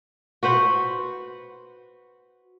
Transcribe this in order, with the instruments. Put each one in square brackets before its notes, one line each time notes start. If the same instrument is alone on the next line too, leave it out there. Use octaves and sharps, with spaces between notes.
[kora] F#4 B4 C5 F#5